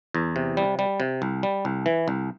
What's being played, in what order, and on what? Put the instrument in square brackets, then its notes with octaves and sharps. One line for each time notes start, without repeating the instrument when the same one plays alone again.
[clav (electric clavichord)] E2
C3
G3
G3
C3
C2
G3
C2
E3
C2